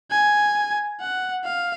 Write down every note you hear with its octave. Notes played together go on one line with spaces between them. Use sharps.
G#5
F#5
F5